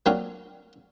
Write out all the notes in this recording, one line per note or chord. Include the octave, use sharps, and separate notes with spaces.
F#3 A#3 C4 D4 F4 F#4